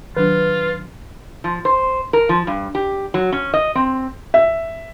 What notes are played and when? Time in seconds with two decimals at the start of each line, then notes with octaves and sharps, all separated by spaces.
0.17 D#3 F#3 D4 F4 B4
1.44 F3
1.65 C5
2.13 A#4
2.29 F3
2.47 G2
2.75 G4
3.14 F#3
3.32 C#4
3.54 D#5
3.75 C4
4.34 E5